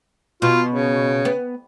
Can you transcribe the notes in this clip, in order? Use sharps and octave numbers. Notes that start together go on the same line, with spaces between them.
B2 F4
C#3
B3